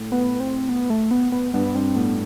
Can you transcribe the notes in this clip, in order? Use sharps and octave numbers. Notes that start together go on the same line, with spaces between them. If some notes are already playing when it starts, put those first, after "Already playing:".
Already playing: A2
B3
C4
B3
A3
B3
B3
G2 B3
G2 C4
A2 B3